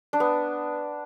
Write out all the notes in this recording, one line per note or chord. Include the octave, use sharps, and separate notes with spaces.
D4
B3